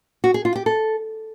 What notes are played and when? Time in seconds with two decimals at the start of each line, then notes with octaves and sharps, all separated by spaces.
0.24 F#4
0.34 G#4
0.45 F4
0.56 G4
0.66 A4